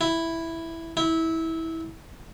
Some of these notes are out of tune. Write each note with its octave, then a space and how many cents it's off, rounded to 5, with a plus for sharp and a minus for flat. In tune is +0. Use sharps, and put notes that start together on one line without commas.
E4 +0
E4 -20